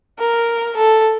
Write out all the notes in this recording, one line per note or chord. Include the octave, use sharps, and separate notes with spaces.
A#4
A4